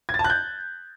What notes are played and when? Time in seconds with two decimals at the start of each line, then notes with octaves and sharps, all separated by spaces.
0.09 G#6
0.14 A6
0.19 A5
0.24 F#6
0.30 G6